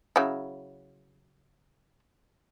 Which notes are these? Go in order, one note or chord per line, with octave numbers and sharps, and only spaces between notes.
C#3 F#3 E4